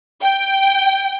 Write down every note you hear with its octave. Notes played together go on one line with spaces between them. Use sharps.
G5